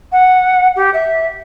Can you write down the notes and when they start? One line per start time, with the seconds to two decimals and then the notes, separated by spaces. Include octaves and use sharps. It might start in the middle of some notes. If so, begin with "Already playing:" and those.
0.12 F#5
0.76 G4
0.94 E5